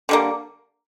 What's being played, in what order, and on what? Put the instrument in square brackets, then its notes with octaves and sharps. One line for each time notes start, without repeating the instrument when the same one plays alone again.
[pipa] D3 G3 A#3